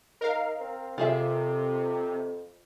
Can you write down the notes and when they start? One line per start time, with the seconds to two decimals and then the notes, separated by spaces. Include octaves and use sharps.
0.21 D#4 A#4 F5
0.60 C4
0.98 F2 C3 F4 G#4 E5